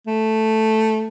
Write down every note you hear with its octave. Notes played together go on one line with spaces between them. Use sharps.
A3